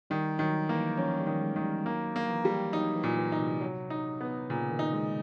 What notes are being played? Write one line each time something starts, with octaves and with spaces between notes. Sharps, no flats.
D#3 G3
D#3 F#3
E3 A#3
F3 C#4
G3
D#3
G#3
D#3
G3
F#3 A#3
A#3
E3
G3
F#3 D#4
E3
A#2
E3
D#4
C3
F#3
D#4
B3
A#2 C#3
D#3
D#4
G#3